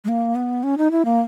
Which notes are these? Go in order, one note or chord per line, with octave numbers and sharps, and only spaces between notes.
G#3
A#3
B3
C#4
D#4
E4
A#3